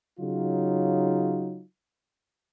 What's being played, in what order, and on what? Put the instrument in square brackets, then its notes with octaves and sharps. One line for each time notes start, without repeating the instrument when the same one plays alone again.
[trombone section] C#3 F#3 D#4 F4